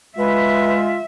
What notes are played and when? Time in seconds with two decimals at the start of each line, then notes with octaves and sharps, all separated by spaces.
0.18 G#3 F4 B4 E5